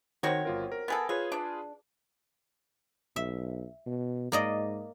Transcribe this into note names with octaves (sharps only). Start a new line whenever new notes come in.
D#3 C4 F#4 C#5
G1 F4 A#4
A#4
B3 G#4 A4
F4 G#4 B4 C#5
D4
B1 E5
B2
G#2 A#3 D5 D#5